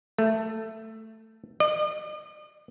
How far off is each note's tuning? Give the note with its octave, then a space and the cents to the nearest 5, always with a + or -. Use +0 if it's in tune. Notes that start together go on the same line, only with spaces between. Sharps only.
A3 +10
D#5 -45